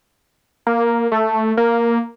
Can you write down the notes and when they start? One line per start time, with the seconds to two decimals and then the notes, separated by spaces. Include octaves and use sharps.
0.67 A#3
1.12 A3
1.57 A#3